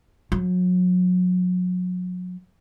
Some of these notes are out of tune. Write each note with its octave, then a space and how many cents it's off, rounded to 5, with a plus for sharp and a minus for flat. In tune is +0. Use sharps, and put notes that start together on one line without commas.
F#3 -35